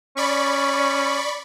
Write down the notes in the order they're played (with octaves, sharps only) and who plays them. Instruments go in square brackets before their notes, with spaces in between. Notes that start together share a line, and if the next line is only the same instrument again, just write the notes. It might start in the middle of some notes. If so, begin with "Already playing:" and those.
[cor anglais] C#4 [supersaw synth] D5 B5 C#6